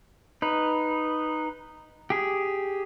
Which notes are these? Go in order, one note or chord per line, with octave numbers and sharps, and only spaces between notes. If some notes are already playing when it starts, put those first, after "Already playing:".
D#4 B4
G4 G#4